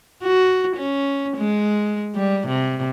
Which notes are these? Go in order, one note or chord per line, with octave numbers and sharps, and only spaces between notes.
F#4
C#4
G#3
G3
C3